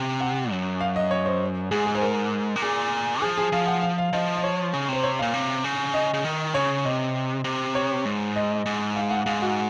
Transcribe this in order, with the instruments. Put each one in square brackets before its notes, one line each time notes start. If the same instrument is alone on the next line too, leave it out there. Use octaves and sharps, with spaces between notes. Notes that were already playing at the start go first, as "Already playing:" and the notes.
Already playing: [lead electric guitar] C3
[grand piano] F#5
[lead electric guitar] F#2
[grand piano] F5
D#5
C#5
C5
[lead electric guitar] G#2 [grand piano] G#4
[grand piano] G#4
C5
A#4
[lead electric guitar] C3
[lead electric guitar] A#2 [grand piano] G#4
[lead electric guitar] F3 [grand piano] G#4
[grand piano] G#4
[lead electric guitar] F3 [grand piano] F5
[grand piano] F#5
F5
F5
[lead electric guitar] F3 [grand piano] D#5
[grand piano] D#5
C#5
[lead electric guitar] C#3
[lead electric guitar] C3 [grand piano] C5
[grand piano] C#5
[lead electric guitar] A#2 [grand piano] F5
[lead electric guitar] C3
C#3
[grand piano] D#5
[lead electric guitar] C#3
D#3
[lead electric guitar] C#3 [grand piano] C#5
[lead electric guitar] C3 [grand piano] D#5
[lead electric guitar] C3
[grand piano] C#5
[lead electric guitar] G#2
[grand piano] D#5
[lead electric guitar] G#2
[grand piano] F5
F#5
[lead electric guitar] G#2 [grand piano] F5
[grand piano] F#4